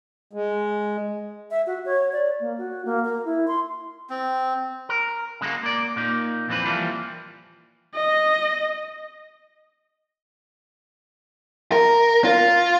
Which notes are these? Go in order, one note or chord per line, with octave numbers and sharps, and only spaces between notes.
G#3
E5
F#4
C#5
D5
A#3
F#4
A#3
A#4
E4
C6
C4
A#4
C#3 G#3 A#3 F#4
A#3 D5
A#2 A#3 D#4
F2 E3 C4 B4
E3 F3 G3 A#3
D#5
A#4
F4